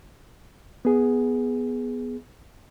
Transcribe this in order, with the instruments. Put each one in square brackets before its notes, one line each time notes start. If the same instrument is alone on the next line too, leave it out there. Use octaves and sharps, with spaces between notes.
[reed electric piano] B3 G#4